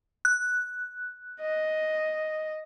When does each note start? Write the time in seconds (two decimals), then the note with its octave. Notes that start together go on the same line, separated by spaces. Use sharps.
0.25 F#6
1.41 D#5